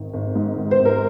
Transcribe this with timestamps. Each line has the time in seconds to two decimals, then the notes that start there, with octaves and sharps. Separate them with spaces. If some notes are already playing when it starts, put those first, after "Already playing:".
Already playing: G#1 D#3
0.14 G#1
0.35 G#2
0.57 D#3
0.71 C5
0.80 G#1
0.85 A#4